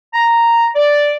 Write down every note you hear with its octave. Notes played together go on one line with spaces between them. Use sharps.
A#5
D5